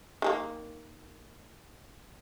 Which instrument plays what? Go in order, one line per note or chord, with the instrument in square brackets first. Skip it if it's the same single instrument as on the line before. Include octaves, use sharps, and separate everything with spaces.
[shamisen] D#3 G#3 A#3